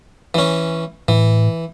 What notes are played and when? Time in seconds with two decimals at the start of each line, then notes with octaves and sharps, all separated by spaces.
0.34 E3 C#4
1.08 A2 E3